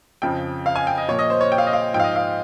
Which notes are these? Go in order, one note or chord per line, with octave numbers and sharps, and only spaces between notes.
F2 C#3 F3 G5
F5
G#5
G5
D#5
A#2 F3 C#5
D#5
C5
C#5
G5
F5
D#5
F5
G#2 F3 G5
F5
D#5
F5